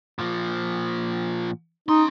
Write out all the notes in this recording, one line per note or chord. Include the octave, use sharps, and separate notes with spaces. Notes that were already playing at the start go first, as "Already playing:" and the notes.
A#2 F3
C#4 D#4 C6